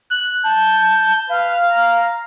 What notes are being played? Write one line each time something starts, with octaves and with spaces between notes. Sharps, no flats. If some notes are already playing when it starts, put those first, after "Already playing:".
F#6
A5 G6
B4 F5
A#5